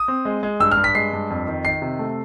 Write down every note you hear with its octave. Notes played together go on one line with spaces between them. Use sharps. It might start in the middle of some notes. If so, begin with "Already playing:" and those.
Already playing: D#6
C4
G#3
G#3
G2 E6
F6
G2
B6
G#3 C7
G2
F2
D#3
D#3 C7
C3
A3